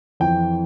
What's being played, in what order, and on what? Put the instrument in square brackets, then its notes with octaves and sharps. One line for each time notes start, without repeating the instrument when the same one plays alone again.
[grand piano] F2 E3 G5